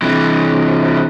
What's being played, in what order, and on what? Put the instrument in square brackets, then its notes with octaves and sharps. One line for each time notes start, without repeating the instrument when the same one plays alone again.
[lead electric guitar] C3 E3